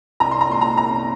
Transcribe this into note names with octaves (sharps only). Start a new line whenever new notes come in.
C2 A#5
C6
A#5
A#2 G#3 C6
A#5
C2 A#5